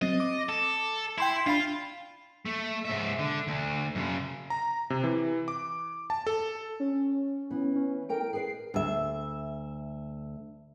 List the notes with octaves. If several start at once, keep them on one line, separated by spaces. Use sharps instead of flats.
F#3 C4 D#5 A6
D6
A4
E4 G5 C6 B6
D4 F4 F5 B5
A3
G#2 E5
D3
D2
F#2 C#3
A#5
C3
E3
D6
A5
A4
C#4
E3 B3
C#4
A4 A#4 G5 D7
G#4 B4 D#5 C7
D2 E5